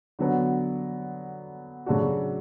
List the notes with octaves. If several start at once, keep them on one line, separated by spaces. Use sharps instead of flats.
D3 F#3 B3
C#3 F#3 A3 D4 F#4